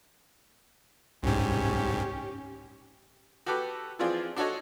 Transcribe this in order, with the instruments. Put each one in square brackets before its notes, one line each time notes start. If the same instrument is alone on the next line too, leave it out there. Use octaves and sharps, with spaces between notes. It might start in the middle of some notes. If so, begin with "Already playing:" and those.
[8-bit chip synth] C2 G#2 [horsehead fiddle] C#4 G4
[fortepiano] F#4 G4 A4 B4 D6
E3 F3 C4 F4 G#4 D5
D4 F#4 A4 C#5 D#5